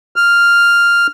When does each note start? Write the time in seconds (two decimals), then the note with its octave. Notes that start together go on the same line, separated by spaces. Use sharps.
0.16 F6